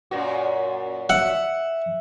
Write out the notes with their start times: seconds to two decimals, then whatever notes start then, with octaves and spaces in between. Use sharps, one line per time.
0.11 F#2 A#2 F#4
1.09 E5 F#5